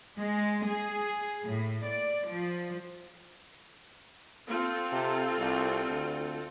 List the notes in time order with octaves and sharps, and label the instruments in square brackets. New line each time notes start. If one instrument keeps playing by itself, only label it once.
[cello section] G#3
G#4
A2
D5
F3
[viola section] C4 F4 A4
[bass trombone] C3
C2
D2